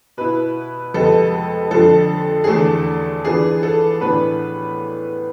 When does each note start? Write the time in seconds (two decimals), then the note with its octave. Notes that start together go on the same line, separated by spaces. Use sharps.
0.17 B2 B3 E4 B4
0.94 F2 C3 G#3 B3 A4
1.71 F2 D3 F3 A4
2.44 G#4
2.47 E2 D3 A3 A4
3.24 E3 B3 D4 F4 G#4
3.63 A4
4.01 A2 E3 B3 D4 B4